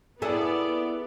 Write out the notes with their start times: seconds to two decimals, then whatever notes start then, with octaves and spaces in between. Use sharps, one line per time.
0.22 B3 E4 G#4 A4 D5